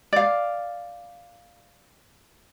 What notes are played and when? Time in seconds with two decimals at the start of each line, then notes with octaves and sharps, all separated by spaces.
0.13 D5 F5